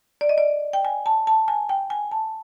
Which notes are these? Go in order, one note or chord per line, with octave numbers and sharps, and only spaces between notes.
D5
D#5
D5
G5
G#5
A5
A5
G#5
G5
G#5
A5